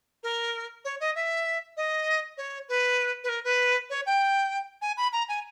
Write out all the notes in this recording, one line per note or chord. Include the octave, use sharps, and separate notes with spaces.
A#4
C#5
D#5
E5
D#5
C#5
B4
B4
A#4
B4
C#5
G5
G#5
B5
A#5
G#5